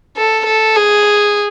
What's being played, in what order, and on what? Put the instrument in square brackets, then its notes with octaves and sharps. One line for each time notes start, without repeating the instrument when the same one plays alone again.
[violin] A4
A4
G#4